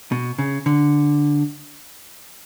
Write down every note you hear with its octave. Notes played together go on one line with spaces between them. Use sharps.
B2
C#3
D3